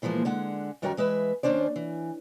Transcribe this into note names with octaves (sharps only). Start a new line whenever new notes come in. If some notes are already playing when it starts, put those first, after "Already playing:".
A#2 E3 F3 G#3 A#3
D3 G#3 F#5
F#2 D#3 G3 F#4 A#4 G5
E3 G#3 B4 E5
D#2 A#2 C#4 D4 C5 D5
E3